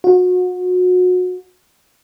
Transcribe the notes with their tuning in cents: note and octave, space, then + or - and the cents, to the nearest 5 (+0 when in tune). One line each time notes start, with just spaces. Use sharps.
F#4 -30